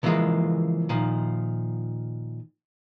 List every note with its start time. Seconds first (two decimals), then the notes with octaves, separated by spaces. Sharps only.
0.03 C#3 E3 F3 G3 G#3 A#3
0.89 A#2 D#3 F3